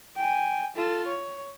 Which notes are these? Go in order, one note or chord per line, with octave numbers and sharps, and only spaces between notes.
G5 G#5
F4 A4
C#5